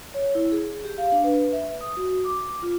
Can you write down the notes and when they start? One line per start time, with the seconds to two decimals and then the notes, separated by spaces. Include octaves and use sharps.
0.14 C#5
0.35 E4
0.52 G#4
0.85 G4
0.98 F5
1.12 D4
1.24 B4
1.52 E5
1.81 D#6
1.97 F#4
2.25 D6
2.62 F4